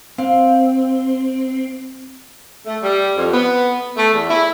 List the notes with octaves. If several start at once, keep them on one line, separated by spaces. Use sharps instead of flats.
C4 F5
A3
G3
F2
B3
A3
E2
E4